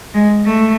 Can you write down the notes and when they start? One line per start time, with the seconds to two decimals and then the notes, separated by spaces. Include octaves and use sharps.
0.14 G#3
0.46 A3